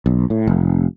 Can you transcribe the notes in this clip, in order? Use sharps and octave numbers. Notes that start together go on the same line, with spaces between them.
B1
A2
F1